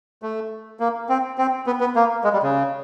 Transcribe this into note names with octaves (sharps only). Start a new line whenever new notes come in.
A3
A#3
C4
C4
B3
B3
A#3
G#3
G3
C#3